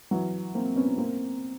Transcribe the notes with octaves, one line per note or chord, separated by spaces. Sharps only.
E3 F#3
A#3 C4
B3 C#4
A#3 C4